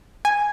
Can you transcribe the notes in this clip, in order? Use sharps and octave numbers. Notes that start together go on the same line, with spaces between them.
G#5